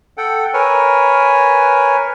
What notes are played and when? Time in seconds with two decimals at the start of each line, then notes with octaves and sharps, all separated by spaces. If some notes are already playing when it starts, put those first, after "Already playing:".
0.17 A4 F#5 G5
0.54 A#4 B4 C#5 G#5